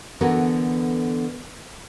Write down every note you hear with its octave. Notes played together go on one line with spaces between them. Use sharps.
D3 E3 B3 F#4 A4 A#4